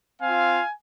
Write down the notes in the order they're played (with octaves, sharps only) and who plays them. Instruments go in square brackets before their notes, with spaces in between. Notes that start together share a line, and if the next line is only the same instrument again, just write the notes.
[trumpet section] C4 F4 F5 G#5